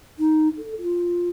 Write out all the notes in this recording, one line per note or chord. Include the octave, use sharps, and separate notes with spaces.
D#4
A4
F4